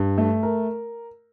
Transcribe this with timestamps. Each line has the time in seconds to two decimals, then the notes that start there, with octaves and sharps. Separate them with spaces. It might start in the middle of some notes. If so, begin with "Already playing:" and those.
Already playing: G2
0.18 A3
0.43 A#4